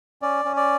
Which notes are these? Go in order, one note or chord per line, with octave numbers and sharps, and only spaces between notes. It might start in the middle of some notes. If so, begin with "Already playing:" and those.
C#4 D5
C#4
D5